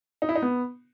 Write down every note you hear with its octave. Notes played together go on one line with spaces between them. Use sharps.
D#4
E4
D#4
B3